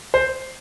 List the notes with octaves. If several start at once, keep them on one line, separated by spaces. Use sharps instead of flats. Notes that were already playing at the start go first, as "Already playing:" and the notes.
C5